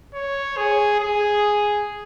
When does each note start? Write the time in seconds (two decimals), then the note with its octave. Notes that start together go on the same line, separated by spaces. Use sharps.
0.14 C#5
0.57 G#4
0.99 G#4